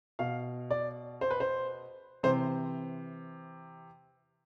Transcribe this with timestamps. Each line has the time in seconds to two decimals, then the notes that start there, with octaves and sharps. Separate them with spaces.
0.19 B2 F5
0.71 D5
1.21 C5
1.31 B4
1.40 C5
2.23 C3 E3 C5